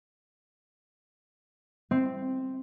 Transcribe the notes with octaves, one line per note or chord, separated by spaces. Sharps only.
C4